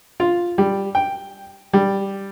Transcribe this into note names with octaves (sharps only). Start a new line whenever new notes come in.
F4
G3
G5
G3